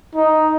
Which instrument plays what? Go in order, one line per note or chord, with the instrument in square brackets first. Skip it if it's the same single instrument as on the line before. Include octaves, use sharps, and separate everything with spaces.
[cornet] D#4